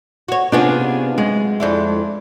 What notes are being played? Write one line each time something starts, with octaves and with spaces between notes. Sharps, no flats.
F#4 C#5
C3 B3 C#4 D4 F4 G#4
F#2 G#3
F2 D4 E4